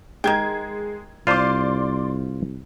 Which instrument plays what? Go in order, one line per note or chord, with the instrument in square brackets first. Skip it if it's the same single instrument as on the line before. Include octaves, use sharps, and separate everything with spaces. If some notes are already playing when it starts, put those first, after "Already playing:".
[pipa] D#3 G5 [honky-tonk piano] G#3 G#6
[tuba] C2 [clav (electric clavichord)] F4 C5 [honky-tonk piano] D5 C6 D6